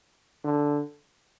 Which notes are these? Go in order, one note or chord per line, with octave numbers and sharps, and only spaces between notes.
D3